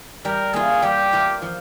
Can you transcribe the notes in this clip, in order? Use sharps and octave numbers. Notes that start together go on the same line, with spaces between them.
G3 A#4
A#3 F4 G#4
G3 G4
A#3 F4
F3